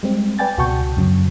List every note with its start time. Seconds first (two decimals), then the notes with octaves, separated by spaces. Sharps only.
0.03 G3 G#3 C4
0.39 B4 D5 G5 G#5 A6
0.57 C#2 B2 F#4 A5 C#6 G6
0.97 F#2 C#3 F#3